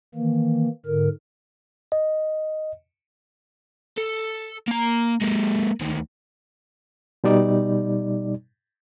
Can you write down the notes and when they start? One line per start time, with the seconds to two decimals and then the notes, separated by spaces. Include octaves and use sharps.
0.15 D#3 E3 A#3
0.86 G#2 D3 A#4
1.92 D#5
3.98 A4
4.68 A#3 A#5
5.21 G#3 A#3
5.80 D2 D#3
7.24 B2 G3 D#4 D5